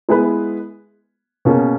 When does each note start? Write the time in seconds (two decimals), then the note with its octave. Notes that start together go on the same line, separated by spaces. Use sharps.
0.09 G#3 B3 E4 G#4 B4
1.45 B2 A#3 C#4 G#4